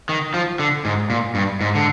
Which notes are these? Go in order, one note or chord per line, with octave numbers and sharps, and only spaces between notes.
D#3
F3
D3
G#2
A#2
G2
G#2
D3